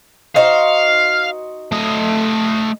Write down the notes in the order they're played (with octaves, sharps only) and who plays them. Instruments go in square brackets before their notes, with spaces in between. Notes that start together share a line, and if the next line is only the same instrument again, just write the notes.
[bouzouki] D#4 F#4 C5 [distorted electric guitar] F5
[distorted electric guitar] A3 D#5